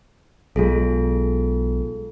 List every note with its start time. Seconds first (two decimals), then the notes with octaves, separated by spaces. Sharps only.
0.56 B1 G#3 F4 G#4 A4